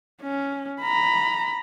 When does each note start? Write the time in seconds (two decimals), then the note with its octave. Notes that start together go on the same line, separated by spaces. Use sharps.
0.21 C#4
0.81 A#5 B5